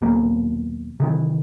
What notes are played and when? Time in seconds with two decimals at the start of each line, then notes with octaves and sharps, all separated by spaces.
0.02 D#1 B1 B2 A#3
1.00 C3 D#3 E3